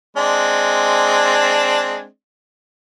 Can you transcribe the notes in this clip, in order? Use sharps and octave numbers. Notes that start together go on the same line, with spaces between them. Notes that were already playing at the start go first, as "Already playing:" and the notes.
G#3 C4 D4